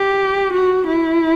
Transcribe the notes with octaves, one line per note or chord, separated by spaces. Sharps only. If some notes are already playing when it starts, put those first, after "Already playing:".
Already playing: G4
F#4
E4